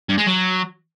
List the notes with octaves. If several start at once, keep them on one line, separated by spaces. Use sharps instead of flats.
G2
G#3
F#3